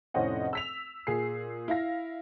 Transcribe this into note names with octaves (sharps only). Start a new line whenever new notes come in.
F1 A2 C#4 C5 D#5 F#5
E6 B6 F7
A#2 G#4 C7
E4 F5 A#6